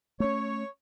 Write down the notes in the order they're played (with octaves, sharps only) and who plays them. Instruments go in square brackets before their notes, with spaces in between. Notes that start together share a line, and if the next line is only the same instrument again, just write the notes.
[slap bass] A3 C#4 [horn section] C#5